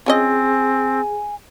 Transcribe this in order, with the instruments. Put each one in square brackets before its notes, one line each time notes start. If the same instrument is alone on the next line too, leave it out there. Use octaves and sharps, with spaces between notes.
[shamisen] F3 C#4 D#5 [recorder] C4 [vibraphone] G#4 [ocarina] G#5